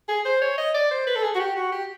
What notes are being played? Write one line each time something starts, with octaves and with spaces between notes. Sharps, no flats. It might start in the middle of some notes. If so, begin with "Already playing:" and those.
G#4
C5
C#5
D#5
D5
C5
B4
A4
G#4
F#4
G4
F#4
G4